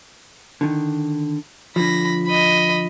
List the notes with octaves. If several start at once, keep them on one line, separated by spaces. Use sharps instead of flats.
D3 D#3
D3 F3 B5 A#6
D#5 B5